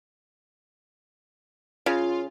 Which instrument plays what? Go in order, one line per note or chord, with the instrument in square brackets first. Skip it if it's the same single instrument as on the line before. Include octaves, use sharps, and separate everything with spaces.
[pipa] C#3 [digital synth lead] F4